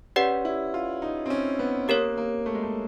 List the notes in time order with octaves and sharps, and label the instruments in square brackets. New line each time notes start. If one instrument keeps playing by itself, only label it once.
[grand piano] C#4 [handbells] G4 B4 D5 F#5
[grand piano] E4
F4
D#4
C4
C#4
B3
[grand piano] A#3 [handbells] G4 A#4 C#5
[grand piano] A#3
A3
G#3
A3